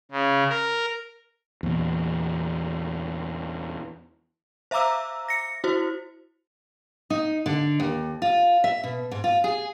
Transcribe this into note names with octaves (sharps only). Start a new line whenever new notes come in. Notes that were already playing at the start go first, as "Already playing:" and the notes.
C#3
A#4
E2 A#2
C5 E5 F5 A#5 D6 E6
A#6 C#7
E4 F#4 C5
D#4
D3
D#2
F4
E5
B2
G#2
F4
G#4